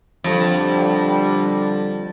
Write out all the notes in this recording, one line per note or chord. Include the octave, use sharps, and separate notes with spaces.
F2 D3 G3